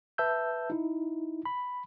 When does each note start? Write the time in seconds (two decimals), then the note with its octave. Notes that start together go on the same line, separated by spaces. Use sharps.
0.18 B4 E5 A5 E6 G6
0.70 D#4 E4
1.45 B5